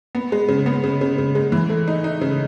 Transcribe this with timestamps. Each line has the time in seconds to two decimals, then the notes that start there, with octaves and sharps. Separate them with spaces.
0.15 B3
0.32 G#3
0.48 C#3
0.66 B3
0.84 C#3
1.01 C#3
1.18 C#3
1.35 G#3
1.52 E3
1.70 A3
1.88 D#4
2.04 D#4
2.21 C#3